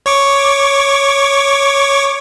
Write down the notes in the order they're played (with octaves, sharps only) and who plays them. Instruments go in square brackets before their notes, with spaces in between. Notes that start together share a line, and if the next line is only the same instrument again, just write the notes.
[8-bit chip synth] C#5 C#6 D6